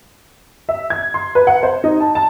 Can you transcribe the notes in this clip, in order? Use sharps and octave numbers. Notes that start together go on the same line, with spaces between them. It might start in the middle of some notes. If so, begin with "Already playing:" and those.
E5
G#6
C6
B4
F#5
C5
D#4
A5
A5